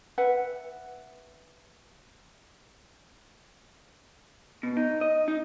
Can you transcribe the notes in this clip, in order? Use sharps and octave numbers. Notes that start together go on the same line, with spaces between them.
B4 E5 F#5
B2
D#4
D#5
D#4